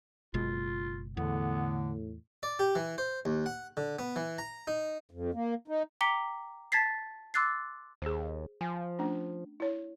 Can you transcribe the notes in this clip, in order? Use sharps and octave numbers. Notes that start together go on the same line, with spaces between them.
F#1 B2 G#3 F4
E2 A2 D3 B3
D5
G4
E3
C5
D#2
F#5
D3
B3
E3
A#5
D#4
F2
A#3
D#4
G5 A#5 D6 B6 C#7 G7
A5 G#6 A6 B6 C7
C6 D6 E6 F#6 A6 C7
D#2 G#4 C5
F3 G#5
A3 C#4 D4
E4 C#5